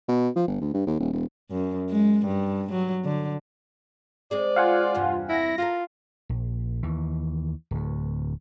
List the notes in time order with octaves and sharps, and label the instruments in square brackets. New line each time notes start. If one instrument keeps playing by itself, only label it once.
[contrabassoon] B2
F3
G1
D2
G2
D#2
D#1
E1
[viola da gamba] F#2
G#3
G2
F#3
D3
[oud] G#3 C4 G#4 [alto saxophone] D5
[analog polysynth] F4 [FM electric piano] F5 F#5 G#5
[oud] E2 G2 C3
[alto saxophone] E4 [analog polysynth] A#6
[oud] E4 A4 A#4 [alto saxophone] F4
[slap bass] A#1
D#2 E3
D1 D2